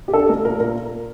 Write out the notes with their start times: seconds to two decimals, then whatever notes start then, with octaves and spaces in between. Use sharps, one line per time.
0.08 G4
0.13 D4 A4
0.29 A3 A#4
0.45 A#2 A#4
0.60 A#2 A#4